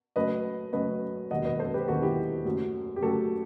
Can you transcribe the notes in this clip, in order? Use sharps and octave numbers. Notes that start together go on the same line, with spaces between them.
F#1 F#2 F#3 A3 B4 D#5
F#1 F#2 F#3 A3 B4 D#5
E1 D#2 D#3 F#3 D#5 F#5
B4 D#5
A4 C5
G4 B4
E1 D#2 D#3 F#3 F#4 A4
E4 G4
F#1 F#2 F#3 A3
G4
F#1 F#2 F#3 A3 F#4 A4